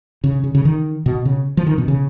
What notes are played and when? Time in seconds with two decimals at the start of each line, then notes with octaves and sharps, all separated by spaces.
0.24 C#3
0.44 C#3
0.55 C#3
0.65 D#3
1.06 B2
1.25 C#3
1.57 F3
1.66 D#3
1.78 B2
1.88 C#3